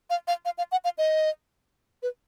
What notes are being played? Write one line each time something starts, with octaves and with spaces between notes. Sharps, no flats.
F5
F5
F5
F5
F#5
F5
D#5
B4